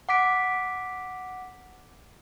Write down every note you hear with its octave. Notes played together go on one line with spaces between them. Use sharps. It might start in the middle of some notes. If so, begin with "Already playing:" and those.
F#5 D6 B6 D7